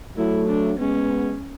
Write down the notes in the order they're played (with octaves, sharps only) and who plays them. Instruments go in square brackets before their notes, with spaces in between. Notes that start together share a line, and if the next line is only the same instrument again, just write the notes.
[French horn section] F#3 A3 [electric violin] E4
[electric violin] D4
[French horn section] G#3 B3 [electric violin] C#4